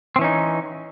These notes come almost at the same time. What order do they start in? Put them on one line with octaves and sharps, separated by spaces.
C4 E3 C#4 D#4